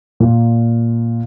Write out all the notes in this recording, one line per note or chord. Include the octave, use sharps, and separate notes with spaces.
A#2